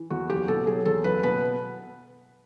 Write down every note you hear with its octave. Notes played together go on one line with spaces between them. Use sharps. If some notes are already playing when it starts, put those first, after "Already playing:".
Already playing: E3
E2 F#4
F#1 G4
B2 A4
F#3 G#4
E2 A4
F#1 B4
B2 B4